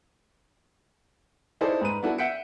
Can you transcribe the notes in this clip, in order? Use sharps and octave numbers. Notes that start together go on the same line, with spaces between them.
D#4 E4 G#4 A4 C5 D5
G#2 B4 D#7
B3 D4 E4 F#4 A4
E5 F#5 G6 B6 C#7 D7